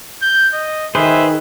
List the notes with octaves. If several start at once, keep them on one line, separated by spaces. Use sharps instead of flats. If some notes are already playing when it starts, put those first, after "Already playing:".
G6
D#5
D#3 G#4 B4 C5 E5